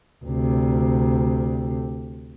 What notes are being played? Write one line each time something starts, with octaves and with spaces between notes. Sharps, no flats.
D2 C3